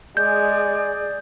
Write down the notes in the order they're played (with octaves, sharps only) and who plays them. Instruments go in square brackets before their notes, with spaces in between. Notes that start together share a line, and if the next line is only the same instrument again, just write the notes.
[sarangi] G#3 [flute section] G#4 D5 [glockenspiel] G6